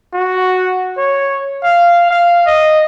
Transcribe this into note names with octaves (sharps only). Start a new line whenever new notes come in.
F#4
C#5
F5
F5
D#5